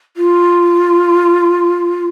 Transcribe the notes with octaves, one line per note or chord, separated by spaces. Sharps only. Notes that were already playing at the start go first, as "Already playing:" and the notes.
F4